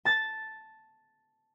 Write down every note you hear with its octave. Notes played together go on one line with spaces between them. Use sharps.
A5 A6